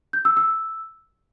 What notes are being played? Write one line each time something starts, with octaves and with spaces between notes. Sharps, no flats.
G6
E6
E6